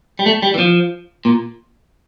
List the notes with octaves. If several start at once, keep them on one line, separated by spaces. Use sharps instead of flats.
G3
A3
G3
E3
F3
A#2